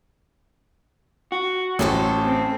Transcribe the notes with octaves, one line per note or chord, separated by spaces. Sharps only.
F#4
A1 C#4 A4 C5
C4